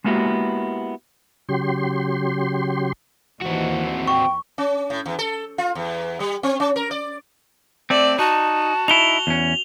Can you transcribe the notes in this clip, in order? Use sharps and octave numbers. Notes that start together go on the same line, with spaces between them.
G#3 A#3 B3 E4 F#4 G4
C#3 F#3 G4 C6
D#2 E3 C4 F#4
G5 C#6
C#4
A2
E2
A4
F4
E2
G3
C4
C#4
A#4
D5
A3 C4 D5
D#4 F#4 A5
D#4 E4 F7 G7
E2 C#4